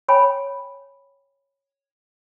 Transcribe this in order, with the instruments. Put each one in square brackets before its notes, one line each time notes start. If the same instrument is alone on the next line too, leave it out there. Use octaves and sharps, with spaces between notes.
[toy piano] C#5 G5 G#5 B5